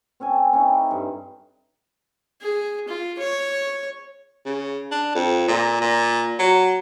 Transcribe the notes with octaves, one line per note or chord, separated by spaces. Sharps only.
C4 C#4 A4 G#5
C4 C#4 D#4 E4
G2
G#4
F4
C#5
C#3
D4
F2
A#2
A#2
F#3